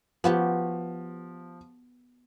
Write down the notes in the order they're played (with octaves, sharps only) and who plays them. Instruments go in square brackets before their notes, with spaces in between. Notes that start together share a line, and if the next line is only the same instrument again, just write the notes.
[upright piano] F3 [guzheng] B3 F#4 G4